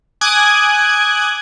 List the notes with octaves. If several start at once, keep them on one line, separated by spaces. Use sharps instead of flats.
G#5 D6 D#6 F#6 G#6